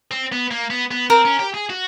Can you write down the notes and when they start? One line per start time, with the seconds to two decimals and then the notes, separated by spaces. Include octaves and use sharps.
0.11 C4
0.32 B3
0.51 A#3
0.70 B3
0.91 B3
1.10 C4 A#4
1.25 C#4
1.39 G4
1.54 G#4
1.70 F#4